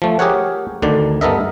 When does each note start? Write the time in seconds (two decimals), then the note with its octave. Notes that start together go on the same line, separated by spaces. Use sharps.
0.02 F3 A3
0.19 G4 G#4 A#4 C#5 F#5
0.82 D2 D3 D#3 D5
1.21 G2 B3 A4 A#4 D#5 E5